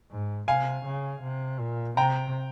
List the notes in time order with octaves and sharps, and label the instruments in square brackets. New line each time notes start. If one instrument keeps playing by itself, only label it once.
[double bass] G#2
[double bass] C3 [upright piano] F5 G#5
[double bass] C#3
C3
A#2
[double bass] C3 [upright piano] G5 A#5